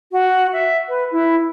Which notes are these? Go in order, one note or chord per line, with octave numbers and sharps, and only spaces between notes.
F#4
E5
B4
E4